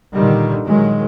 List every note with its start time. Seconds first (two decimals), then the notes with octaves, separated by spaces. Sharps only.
0.15 A#2 D3 D#3 G3
0.65 A#2 D#3 F#3 G#3